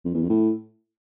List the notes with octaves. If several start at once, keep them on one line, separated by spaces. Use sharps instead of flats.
F2
E2
F2
A2